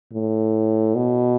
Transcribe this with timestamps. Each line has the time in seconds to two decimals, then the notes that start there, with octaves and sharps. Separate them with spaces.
0.13 A2
0.95 B2